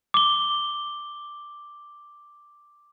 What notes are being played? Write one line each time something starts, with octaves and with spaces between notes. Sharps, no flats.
D6 G7